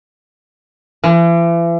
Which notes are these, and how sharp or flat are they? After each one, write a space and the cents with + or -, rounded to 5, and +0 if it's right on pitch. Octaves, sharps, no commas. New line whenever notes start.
E3 +40